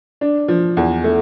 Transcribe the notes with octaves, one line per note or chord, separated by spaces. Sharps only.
D4
F3
E2
A3